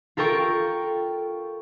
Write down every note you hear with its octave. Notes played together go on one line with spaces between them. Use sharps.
F4 A4 A#4 G5 C#6